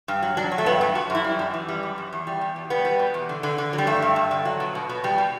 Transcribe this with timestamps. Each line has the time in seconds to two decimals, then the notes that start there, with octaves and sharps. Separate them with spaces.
0.08 G2
0.22 F#3
0.37 F#3 D4
0.52 F#3
0.58 A3
0.66 G2 B3
0.81 F#3 A3
0.95 F#2 F#4
1.10 F#2 E4
1.24 G3
1.39 F#2
1.54 E3
1.68 G3
1.83 F#2
1.98 F#2
2.13 E2
2.27 G3
2.41 E2
2.56 B2
2.70 G3 B3
2.85 G3
2.99 B2
3.14 E2
3.29 D3
3.43 D3
3.58 D3
3.73 F#3
3.78 G3
3.87 G2 A3
4.02 G2
4.16 G2
4.31 D3
4.45 F#3
4.60 B2
4.75 B2
4.89 B2
5.04 B2 G3
5.18 B2